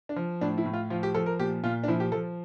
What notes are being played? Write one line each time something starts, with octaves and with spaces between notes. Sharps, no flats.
D4
F3
A2 D4
E4
A2
F4
F3 F4
G4
F3 A4
A#4
A#2 G4
A#2 F4
D4
F3 E4
G4
F3 A4